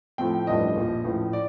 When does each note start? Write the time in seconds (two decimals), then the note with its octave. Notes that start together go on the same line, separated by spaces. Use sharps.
0.18 A2 F3 A3 C4 G5
0.47 A1 G2 F3 A3 D4 D#5
0.76 A#1 A#2 F3
1.04 A1 A2 F3
1.33 D5